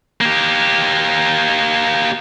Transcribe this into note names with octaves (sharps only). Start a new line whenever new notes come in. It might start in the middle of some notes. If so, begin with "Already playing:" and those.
A#3 G4